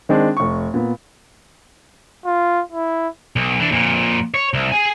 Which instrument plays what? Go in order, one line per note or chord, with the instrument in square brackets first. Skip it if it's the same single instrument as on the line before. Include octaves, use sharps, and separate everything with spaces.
[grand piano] D#3 G#3 C4 D4
F1 C#6
A#2 B3
[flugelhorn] F4
E4
[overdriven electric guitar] B1
E3 D4
F2 A#2
C#5
C2
G#4 G#5